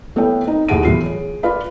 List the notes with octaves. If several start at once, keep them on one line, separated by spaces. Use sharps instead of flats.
A3 B3 E4 C#5 G5
C4 D#4
D#2 A2 G#4 F#5 D7 D#7
E2 A2 F#3 E4 F4 C7
G#4 C#5
F4 B4 D5 F5 B5